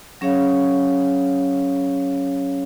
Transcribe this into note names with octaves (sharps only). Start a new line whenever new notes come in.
F#3 C#4 G#4 C#5 F5